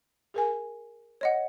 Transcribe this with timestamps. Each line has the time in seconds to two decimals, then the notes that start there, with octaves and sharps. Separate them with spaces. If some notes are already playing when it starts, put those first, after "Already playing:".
0.34 G#4 A#4 G#5
1.21 C#5 D#5 F#5